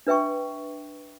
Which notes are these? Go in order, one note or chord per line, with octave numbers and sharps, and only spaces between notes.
D4 B4 E5 G5 C#6